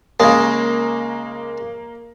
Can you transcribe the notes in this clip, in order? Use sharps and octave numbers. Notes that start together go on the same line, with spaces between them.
C#3 G#3 A#3